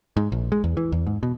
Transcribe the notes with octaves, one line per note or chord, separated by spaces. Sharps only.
G#2
A#1
G#3
E2
E3
E2
G#2
B2